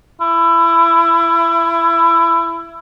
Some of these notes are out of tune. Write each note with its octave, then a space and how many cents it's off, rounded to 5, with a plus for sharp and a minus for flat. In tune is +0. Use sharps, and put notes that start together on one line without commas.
E4 +20